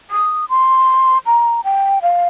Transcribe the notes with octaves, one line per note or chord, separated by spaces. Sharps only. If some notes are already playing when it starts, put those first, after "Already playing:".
D#6
C6
A#5
G5
F5